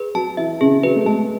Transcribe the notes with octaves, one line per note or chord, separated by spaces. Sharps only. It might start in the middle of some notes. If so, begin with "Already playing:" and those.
Already playing: G#4 B4
F#3 A5
E3 E5
C#3 G#4
F#3 B4
A3
G#3 A5